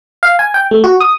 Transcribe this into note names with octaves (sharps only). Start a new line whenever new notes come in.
F5
G#5
G5
A3
F#4
D#6